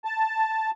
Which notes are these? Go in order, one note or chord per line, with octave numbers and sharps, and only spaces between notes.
A5